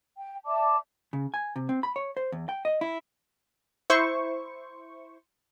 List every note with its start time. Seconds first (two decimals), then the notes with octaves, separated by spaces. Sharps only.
0.18 G5
0.46 D5 E5 A5 D6
1.13 C#3
1.34 G#5
1.56 C3
1.69 C4
1.83 B5
1.96 C#5
2.17 C5
2.32 E2
2.49 G5
2.65 D#5
2.81 E4
3.90 E4 C5 C#6